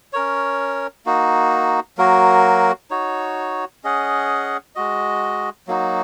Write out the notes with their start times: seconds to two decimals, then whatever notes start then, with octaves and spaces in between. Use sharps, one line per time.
0.13 C#4 A#4 C#5
1.06 A#3 D#4 F#4
1.98 F#3 A#3 F#4 A#4
2.91 D#4 F#4 C#5
3.84 C#4 G#4 D#5 F#5
4.76 G#3 F#4 D#5
5.67 F#3 A#3 D#4 F#4